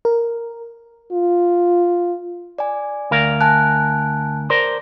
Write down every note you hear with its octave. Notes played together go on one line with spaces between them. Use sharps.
A#4
F4
D5 G#5
D2 A#4 F5
G#5 A5 F#6
A#4 C5 D5